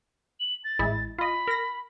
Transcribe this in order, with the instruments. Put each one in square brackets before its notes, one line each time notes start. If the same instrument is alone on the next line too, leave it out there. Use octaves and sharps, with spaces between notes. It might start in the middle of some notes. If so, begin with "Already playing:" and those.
[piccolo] F#7
A6
[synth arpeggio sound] A1 G#3 E4
[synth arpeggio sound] F4 D#5 [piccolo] B5
[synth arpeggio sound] A#4 A#6